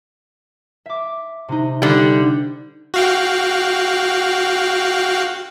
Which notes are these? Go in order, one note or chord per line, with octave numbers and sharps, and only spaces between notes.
E5 D6
C3 D4 D#4
D3 G3 G6
F#4 F5 G5